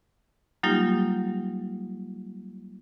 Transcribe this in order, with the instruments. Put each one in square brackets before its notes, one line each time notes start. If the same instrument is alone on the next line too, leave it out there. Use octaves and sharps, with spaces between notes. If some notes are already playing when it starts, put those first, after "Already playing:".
[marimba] F#3 G3 A#3 D#4 F4 G4